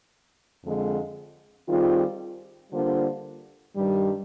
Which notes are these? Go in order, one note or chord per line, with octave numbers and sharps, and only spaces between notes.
F2 D3 G#3
D#3 G3 C4 F4 G#4
D3 G3 A#3 F4 C5
G2 D#3 G3